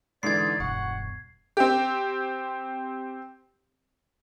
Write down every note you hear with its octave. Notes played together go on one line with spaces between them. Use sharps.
G#2 D3 E3 D5 G#6 C7
E1 G2 B2 F#5 C#6
C4 G4